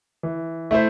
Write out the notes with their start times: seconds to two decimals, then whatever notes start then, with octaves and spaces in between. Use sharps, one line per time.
0.23 E3
0.71 A3 E4 A4 C5